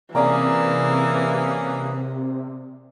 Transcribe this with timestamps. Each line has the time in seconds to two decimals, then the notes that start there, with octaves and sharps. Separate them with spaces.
0.15 C3 E3 A#3 C#4 G#4 D5 G#5 A#5